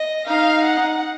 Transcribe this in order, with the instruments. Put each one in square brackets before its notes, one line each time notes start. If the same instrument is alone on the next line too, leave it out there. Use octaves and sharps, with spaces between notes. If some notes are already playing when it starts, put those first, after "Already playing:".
Already playing: [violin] D#5
[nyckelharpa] D#4 [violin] F5
[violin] F#5